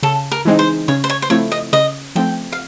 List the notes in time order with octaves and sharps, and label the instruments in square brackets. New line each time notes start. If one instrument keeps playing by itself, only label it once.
[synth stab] C#3 [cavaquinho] A4
[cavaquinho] A#4
[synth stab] E3 G#3 C4 D#4
[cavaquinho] C5
[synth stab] C#3 [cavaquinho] C#5
[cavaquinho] C5
C#5
C5
[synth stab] F3 A3 C4 E4 [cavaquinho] C#5
[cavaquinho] D#5
[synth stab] C#3 [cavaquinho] D#5
[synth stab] F3 A3 C4 [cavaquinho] G5
[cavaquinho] F5